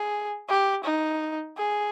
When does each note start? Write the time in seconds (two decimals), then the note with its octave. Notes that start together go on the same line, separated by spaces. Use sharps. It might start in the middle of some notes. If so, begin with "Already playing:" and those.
Already playing: G#4
0.49 G4
0.84 D#4
1.57 G#4